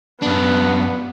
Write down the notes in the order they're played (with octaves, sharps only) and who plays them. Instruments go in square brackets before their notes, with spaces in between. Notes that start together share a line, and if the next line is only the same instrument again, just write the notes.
[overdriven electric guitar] F#2 D4 [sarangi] B3